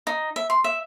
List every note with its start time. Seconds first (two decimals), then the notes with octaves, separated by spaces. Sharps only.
0.07 D#4
0.36 E5
0.50 C6
0.64 E5